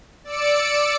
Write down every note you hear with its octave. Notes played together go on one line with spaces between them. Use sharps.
D5 E6 C#7 D7